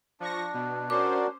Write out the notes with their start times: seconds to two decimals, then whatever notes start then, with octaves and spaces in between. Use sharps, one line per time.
0.20 F3 D4 C#6 A#6
0.54 B2
0.90 C#4 F#4 A#4 C5 D5 D6